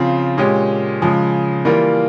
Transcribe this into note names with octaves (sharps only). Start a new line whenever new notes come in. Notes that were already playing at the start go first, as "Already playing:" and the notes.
Already playing: C#3 F3 C4 F4
A#2 G#3 C#4 G4
C#3 F3 G#3
E3 G3 A#3 F4 A#4